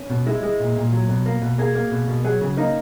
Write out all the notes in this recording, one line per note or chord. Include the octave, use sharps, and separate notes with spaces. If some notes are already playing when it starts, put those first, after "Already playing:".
Already playing: C#4
B2
G#3 E4
G#3
A#2
A#2
F#3
B2
A#3
B2
A#3 G#4
A#3
B2
B2
F#3 G#4
C#3
A#3 D#4